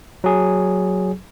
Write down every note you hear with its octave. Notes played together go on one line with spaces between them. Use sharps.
F#3 G#4